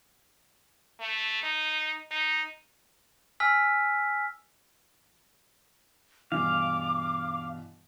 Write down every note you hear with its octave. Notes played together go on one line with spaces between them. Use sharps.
A3
D#4
D#4
G#5 E6 F6 B6
G2 B2 E3 F5 D6